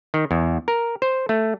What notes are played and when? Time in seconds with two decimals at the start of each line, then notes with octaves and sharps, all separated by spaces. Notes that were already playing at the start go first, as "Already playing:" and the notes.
0.14 D#3
0.31 E2
0.68 A#4
1.02 C5
1.29 A3